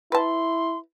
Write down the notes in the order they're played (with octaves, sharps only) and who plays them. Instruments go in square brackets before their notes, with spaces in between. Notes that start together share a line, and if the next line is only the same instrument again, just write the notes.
[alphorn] E4 [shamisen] B4 A5 [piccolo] C6